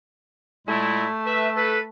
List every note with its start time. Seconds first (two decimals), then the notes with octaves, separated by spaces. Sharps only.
0.67 A#2 G#3 A3 E4
1.24 B4 E5
1.56 A4 B4